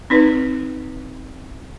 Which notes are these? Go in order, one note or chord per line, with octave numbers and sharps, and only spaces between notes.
C4 D#4 B4